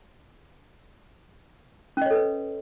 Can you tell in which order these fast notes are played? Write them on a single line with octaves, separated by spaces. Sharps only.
C#4 D#5 C#5 A4 B4